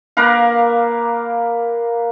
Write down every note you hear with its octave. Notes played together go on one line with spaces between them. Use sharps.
A#3 A#4 B4 F5